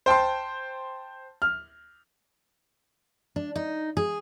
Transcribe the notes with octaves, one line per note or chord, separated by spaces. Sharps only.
C5 G5 A5 C6
F6
D4
D#4
G#4